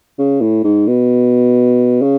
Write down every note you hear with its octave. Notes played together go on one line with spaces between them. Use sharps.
C#3
A2
G#2
B2
C#3